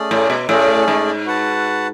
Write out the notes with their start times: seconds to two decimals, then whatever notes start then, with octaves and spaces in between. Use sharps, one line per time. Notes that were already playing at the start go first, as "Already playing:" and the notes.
Already playing: A3 C#4 G#4 D5
0.11 A2
0.30 B2
0.49 A2 A3 C#4 G#4 D5
0.88 G#2
1.26 F#4 B4 F#5 A5